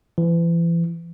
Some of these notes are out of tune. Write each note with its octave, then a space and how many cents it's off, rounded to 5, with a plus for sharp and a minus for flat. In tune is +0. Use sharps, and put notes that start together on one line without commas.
E3 +35